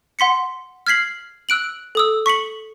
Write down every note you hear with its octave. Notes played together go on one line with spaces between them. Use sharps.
F#5 C6 B6 C#7
F6 G#6 B6 C7 F#7
E6 F#6 D7 F#7
A4 D#6 E6
C#6 B6 C#7 F#7